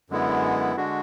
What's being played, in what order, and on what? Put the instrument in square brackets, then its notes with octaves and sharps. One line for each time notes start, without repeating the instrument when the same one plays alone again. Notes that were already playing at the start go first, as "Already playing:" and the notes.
[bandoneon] F#2 D3 G#3 B3 E4
D3 G#3 D4 F#4